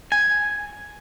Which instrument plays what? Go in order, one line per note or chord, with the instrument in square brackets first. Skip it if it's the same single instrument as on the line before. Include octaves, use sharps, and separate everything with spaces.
[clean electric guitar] G#5